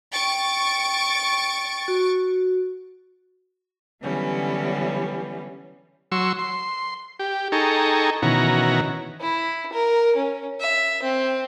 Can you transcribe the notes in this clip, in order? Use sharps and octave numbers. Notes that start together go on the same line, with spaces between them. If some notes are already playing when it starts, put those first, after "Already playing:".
G5 C#6 A6 D7
F#4
D3 E3 F#3 G3 B3 C#4
F#3 C6 C#6 E6
C6
G4
D#4 G#4 A4 G5 A#5 C#6
B2 D#3 E3 C#4 F#4 A#5
E4
A#4
C#4
E5
C4